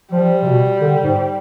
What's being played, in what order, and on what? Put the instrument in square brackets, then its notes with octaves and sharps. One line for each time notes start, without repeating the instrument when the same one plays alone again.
[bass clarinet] F3 [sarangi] G3
[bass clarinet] C3
B2
D3
G#2